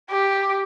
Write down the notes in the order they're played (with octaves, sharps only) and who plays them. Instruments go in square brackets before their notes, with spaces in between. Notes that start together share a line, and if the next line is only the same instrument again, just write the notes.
[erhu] G4